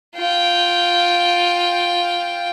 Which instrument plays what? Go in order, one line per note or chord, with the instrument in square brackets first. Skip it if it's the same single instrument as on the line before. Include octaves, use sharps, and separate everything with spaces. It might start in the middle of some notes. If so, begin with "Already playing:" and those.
[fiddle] F4 G5